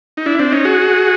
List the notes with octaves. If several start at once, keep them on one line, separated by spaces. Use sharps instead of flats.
D#4
D4 E4
C4 D4
C#4 D#4
F#4 G#4